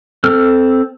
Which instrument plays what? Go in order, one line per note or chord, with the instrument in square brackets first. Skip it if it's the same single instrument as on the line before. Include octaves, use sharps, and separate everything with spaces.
[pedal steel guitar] C4 A4 F6